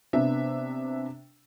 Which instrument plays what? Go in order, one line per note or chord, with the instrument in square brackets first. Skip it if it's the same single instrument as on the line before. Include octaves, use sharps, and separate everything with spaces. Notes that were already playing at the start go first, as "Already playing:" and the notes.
[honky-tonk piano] C3 B3 D4 E5